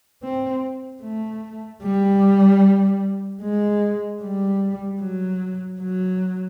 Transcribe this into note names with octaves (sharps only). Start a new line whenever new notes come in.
C4
A3
G3
G#3
G3
F#3
F#3